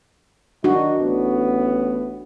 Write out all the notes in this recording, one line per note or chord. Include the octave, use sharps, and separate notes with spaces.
D#3 D4 D#4 F#4
A1 A2 B3